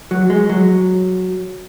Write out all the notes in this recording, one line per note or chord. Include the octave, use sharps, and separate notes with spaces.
F#3
G#3
F#3